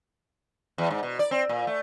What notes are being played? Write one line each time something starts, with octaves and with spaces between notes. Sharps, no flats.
E2
G#2
B2
D5
C4
A#2
A3